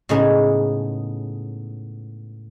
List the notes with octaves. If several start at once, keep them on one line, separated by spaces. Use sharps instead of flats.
A2 C#3 G#3 B3 D#4 G#4